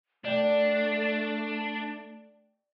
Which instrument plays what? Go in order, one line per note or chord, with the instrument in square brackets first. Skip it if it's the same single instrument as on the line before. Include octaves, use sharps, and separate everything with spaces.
[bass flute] A3 [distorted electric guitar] D4 [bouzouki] D5 G5 A5